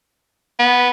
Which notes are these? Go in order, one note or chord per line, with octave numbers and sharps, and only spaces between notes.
B3